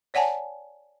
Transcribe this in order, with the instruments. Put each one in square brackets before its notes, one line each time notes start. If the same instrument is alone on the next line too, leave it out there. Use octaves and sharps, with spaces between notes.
[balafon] C#5 D5 F#5 G#5 A5